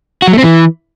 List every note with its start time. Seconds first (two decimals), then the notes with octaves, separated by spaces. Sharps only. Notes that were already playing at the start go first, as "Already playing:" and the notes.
0.22 F#4
0.28 F#3
0.33 A3
0.38 C4
0.44 E3